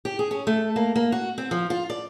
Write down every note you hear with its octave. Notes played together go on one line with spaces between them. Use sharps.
G4
G#4
C#4
A3
A#3
A#3
F#4
C4
F3
F4
D5